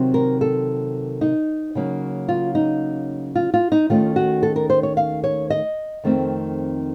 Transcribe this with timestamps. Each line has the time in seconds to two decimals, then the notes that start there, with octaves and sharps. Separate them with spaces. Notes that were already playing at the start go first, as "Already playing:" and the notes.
Already playing: C3 D#3 F#3 C4
0.14 A#4
0.41 A4
1.21 D#4
1.75 C#3 F#3 A#3 C#4
2.29 F4
2.55 D#4
3.35 F4
3.54 F4
3.72 D#4
3.89 D#2 D#3 A3 C#4 F4
4.16 F#4
4.43 A4
4.56 A#4
4.70 C5
4.83 C#5
4.97 F5
5.24 C#5
5.50 D#5
6.04 F2 D#3 A3 C4